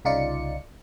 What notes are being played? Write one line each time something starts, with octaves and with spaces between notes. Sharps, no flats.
C2 C#3 D#4 F4 D5 C#7